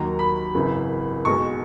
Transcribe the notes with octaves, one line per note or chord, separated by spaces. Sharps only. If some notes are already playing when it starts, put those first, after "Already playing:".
Already playing: D#2 D#3 F#3 A#5
B5
G#1 F#2 C#3 E3
B1 B2 G#3 C#6